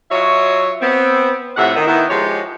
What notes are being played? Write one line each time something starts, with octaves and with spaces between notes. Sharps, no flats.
F#3 F4 F#4 C#5 D#5 E5
B3 C4
F2 A2 C3 E5 F#5
D#3
D#3 B3 E4
F3 G#3 G4 C#5